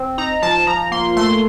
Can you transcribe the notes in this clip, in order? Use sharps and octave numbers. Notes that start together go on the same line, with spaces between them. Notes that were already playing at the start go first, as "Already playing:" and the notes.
Already playing: C4
D#4 A#5
F3 A5
F3 A#5
A#3 C6
A3 C6